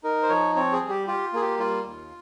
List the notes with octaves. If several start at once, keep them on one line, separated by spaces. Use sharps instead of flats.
D#4 A#4
C5
F3 C#5
C4 C#5
G#4
G3
G4
F4 G4
A#3 G#4
G4
G3 F4
D#2